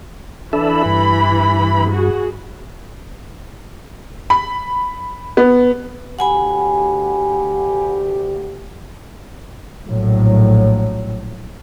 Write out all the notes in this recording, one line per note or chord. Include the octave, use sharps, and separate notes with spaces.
E3 D4 A4 E5 B5
G2
F#4 G#4
B5
B3
D2 G4 F#5 G#5 B5
A#1 A2 F#3